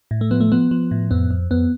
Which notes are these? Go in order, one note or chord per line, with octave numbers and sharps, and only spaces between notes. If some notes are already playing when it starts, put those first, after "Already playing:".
A2
A3
F3 B3
A3
F3 B3
F3
A2
F2 B3
F2
F2 B3